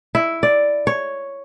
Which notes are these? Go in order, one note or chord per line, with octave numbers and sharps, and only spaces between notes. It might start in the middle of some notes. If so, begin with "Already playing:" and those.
E4
D5
C#5